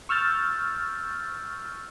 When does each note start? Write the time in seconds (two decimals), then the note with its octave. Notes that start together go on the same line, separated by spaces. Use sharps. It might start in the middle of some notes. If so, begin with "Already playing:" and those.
0.09 C#6 E6 F6 G6 A6